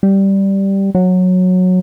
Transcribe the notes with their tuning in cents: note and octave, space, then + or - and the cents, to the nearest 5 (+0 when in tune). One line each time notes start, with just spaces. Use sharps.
G3 -5
F#3 -15